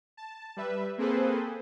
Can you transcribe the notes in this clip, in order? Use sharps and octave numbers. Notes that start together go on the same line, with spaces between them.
A5
G3 B4 E5
A#3 C4 G#4 A4 B4 C5